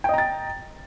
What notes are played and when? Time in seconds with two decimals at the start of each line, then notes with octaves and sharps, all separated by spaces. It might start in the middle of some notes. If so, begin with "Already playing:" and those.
0.04 G5
0.09 D#5
0.13 A#5
0.18 A6